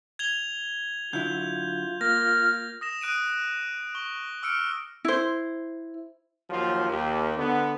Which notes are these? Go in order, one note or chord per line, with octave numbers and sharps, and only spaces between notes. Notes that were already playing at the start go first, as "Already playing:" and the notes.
G#6 F7 G7
D3 F#3 E4 F4 G6
A#3 F6 A#6
D#6 A#6 E7
D#6 F#6 D7 D#7
C#6 G7
D6 E6 F6 C#7 D7
E4 C5
D#2 F3 F#3 F4
D#2
D3 B3